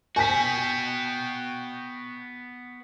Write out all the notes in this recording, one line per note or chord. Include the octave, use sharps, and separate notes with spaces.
B3 F#4 G5 G#5 B6